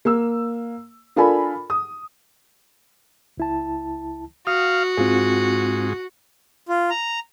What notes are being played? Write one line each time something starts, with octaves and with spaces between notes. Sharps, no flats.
A#3 E6
D4 F4 A4 A#4 G#5 B5
D#6
C#2 E4 A5
F#4 F5 D#6
G#2 C4 F4 G#4
F4
A#5